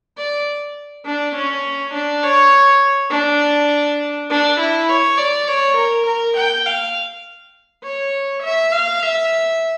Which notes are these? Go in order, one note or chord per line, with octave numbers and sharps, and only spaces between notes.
D5
D4
C#4
D4
C#5
D4
D4
E4
C#5
D5
C#5
A#4
A#4
G5
F5
C#5
E5
F5
E5